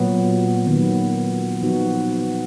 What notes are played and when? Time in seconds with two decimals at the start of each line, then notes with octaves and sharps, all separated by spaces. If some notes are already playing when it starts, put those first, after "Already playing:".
Already playing: A#2 F#3 B3
0.67 D#3 F#3 B3
1.62 F3 B3 D#4 F#4